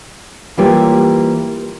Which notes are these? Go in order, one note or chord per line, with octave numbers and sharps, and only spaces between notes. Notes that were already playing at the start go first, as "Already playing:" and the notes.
E3 G3 A#3 F4 G4 C#5